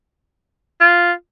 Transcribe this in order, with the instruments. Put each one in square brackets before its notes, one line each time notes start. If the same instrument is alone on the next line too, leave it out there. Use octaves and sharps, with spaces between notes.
[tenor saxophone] F4